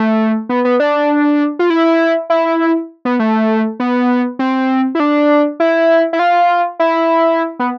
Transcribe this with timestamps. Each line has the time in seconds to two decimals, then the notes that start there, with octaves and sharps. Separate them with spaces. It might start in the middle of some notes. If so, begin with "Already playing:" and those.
Already playing: A3
0.49 B3
0.65 B3
0.80 D4
1.59 F4
1.70 E4
2.30 E4
3.05 B3
3.19 A3
3.80 B3
4.39 C4
4.95 E4
5.00 D4
5.60 E4
6.13 E4
6.19 F4
6.79 E4
7.60 B3